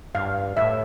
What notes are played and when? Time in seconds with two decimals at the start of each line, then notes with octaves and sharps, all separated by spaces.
0.15 G2 F5
0.57 A2 E5